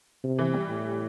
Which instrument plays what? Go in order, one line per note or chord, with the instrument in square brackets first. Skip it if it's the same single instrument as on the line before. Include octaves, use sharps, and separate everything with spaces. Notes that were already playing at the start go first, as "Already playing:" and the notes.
[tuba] C3
[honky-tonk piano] E3
G3
[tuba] A2